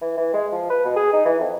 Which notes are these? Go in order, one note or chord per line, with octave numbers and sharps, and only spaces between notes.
E3
E3
G#3
F3
B4
B2
G#4
D#4
E3
F2